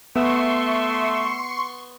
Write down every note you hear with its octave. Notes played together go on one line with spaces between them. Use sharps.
A3 B3 E5 C6 C#6